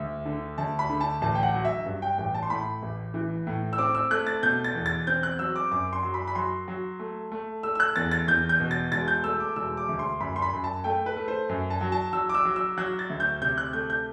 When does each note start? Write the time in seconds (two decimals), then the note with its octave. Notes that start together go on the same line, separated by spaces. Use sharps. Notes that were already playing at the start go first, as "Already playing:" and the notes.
Already playing: D2
0.25 D3
0.58 D2 A5
0.79 B5
0.90 D3
1.01 A5
1.21 A1 A5
1.35 G5
1.43 F#5
1.54 F#3
1.65 E5
1.86 G2
2.02 G5
2.18 A1 G5
2.34 A5
2.43 C6
2.50 A2 B5
2.82 A1
3.14 E3
3.47 A2
3.73 E6
3.78 C4 D6
3.95 E6
4.11 A3 F#6
4.27 A6
4.43 B2 G6
4.64 A6
4.75 E2
4.86 A6
5.07 C4 G6
5.23 F#6
5.39 F#3 E6
5.56 D6
5.71 F#2 D6
5.93 C6
6.03 F#3
6.14 B5
6.28 B5
6.35 F#3 C6
6.68 F#3
6.99 A3
7.32 A3
7.63 A3 E6
7.75 E6
7.80 F#6
7.96 E2 A6
8.11 A6
8.28 E2 G6
8.49 G6
8.60 B2
8.71 A6
8.92 E1 A6
9.08 G6
9.24 A3 E6
9.40 D6
9.56 E1 E6
9.77 D6
9.89 D2
9.99 C6
10.20 F#2 B5
10.36 C6
10.42 B5
10.53 F#2
10.64 A5
10.84 A3 G5
11.06 B4
11.16 A3
11.28 C5
11.49 F#2
11.70 A5
11.81 F#3
11.92 A5
12.13 F#3 E6
12.30 D6
12.35 E6
12.45 F#3
12.56 E6
12.78 F#3 F#6
12.99 A6
13.10 D2
13.20 G6
13.41 C3 G6
13.58 F#6
13.73 A3 G6
13.90 G6